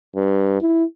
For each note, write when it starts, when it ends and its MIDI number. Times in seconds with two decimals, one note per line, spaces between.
0.16 0.58 43
0.61 0.84 64